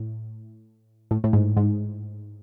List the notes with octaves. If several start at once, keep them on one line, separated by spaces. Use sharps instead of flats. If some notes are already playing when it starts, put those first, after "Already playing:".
Already playing: A2
A2
A2
G#2
G#2